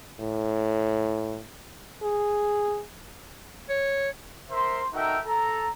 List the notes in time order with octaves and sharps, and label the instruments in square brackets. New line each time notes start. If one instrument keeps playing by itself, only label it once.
[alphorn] A2
G#4
[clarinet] C#5
[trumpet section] A#4 C5 E5 C6
D#4 F#4 A4 A#4 E5 G5
A4 A#5